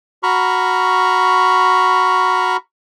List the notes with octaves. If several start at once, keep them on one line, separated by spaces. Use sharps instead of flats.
F#4 A#5 B5 C#6 F6